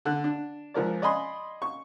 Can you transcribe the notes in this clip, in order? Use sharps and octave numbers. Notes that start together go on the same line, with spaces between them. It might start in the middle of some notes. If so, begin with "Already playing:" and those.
D3 F#6
D4
C#2 F3 A#4 D5
D5 D#5 G#5 B5 C6
C#6